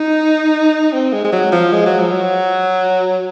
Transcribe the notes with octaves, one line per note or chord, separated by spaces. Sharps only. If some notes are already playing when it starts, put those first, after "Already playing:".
Already playing: D#4
C4
G#3
G#3
F#3
F3
G#3
F#3
F3
F#3